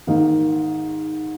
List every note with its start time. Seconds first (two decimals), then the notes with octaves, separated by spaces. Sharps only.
0.07 G#2 D#3 A#3 D#4